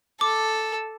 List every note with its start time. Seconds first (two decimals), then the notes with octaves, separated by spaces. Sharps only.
0.21 A4 D6